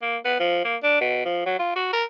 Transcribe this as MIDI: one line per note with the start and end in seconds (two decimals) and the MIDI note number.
0.02 0.17 58
0.25 0.38 59
0.40 0.60 53
0.64 0.76 58
0.83 1.00 62
1.01 1.23 47
1.25 1.45 53
1.46 1.55 54
1.59 1.73 65
1.76 1.92 66
1.93 2.04 70